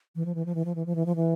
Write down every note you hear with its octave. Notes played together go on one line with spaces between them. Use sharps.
E3
F3
E3
F3
E3
F3
E3
F3
E3
F3
E3